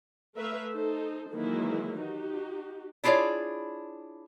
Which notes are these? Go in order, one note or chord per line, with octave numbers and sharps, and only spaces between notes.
A3 A#4 B4 C#5 E5 F5
D#4 A4 C5
D#3 E3 F#3 G#3 A#3 E4
D#4 F#4 G4
D4 E4 F4 G#4 C#5 D5